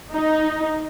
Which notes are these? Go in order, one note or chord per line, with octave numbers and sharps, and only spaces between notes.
D#4